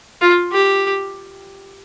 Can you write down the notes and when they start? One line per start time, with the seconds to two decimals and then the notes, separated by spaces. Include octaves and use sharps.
0.21 F4
0.52 G4